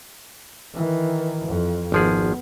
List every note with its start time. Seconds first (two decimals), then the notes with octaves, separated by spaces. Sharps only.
0.74 D#3 E3
1.46 F2
1.92 G#1 F3 B3 G#4